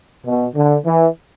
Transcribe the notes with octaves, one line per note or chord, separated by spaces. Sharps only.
B2
D3
E3